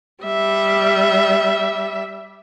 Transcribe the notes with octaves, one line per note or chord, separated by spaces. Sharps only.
G3 E5